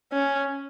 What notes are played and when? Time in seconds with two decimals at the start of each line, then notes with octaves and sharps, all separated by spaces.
0.13 C#4